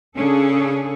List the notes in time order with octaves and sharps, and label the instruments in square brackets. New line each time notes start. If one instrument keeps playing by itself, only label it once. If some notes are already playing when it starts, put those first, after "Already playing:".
[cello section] C#3 C#4 D4 G#4 A4